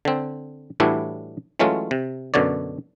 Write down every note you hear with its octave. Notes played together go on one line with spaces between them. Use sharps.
D3 C4
A2 E3 G3 D4 E4 F#4
E3 F#3 G#3 A3 C#4 F4
C3
F#2 B2 D3 C#5 D5